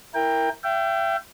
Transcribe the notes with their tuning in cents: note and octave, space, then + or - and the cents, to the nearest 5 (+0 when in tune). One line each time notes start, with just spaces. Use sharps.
E4 +0 A#4 +0 G5 +20
E5 +35 G5 -15